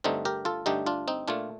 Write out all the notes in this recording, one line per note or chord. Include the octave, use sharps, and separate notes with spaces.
G2 D3 A3 C4 D#4
G4 A#4
F4 A4
G2 D3 A3 D#4 G4
D4 F4
C4 D#4
A#2 A3 D4 F4